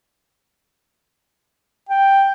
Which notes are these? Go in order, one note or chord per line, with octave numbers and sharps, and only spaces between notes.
G5